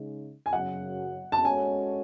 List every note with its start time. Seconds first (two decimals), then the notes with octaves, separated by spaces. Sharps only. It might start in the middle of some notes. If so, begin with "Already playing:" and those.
Already playing: C#3 G#3 D#4
0.46 G#5
0.53 F#2 C#3 F#3 F#5
1.32 A5
1.45 G#3 C#4 F#4 A4 C#5 G#5